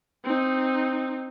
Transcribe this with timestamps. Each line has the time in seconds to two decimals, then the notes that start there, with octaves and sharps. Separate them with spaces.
0.24 C4 D#4